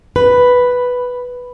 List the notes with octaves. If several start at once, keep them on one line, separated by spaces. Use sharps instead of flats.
B4